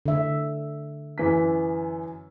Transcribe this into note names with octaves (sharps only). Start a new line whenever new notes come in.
D3 E5
F#2 E3 B6